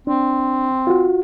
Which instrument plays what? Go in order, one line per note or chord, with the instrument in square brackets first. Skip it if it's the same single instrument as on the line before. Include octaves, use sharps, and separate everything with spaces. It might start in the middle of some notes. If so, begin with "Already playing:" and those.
[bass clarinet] C4 [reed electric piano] D4
[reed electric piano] F4 F#4